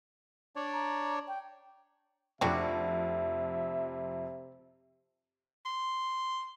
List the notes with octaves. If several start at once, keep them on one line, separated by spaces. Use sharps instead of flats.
D4 C#5 D5
A#5
G5
F1 F2 C3 G3 D4 F#4 E5
C6